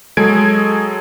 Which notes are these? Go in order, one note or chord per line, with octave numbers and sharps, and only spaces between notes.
F#3 G#3 G#4 A4 G#6 D7